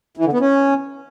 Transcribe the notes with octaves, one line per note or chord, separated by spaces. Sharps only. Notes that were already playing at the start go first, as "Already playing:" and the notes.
E3
D3
B3
C#4